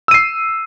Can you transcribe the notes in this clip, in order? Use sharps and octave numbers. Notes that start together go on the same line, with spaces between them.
E6 C7 D#7